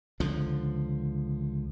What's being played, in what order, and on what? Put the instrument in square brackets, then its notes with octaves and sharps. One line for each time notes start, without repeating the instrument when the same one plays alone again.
[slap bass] C#2 D3 F3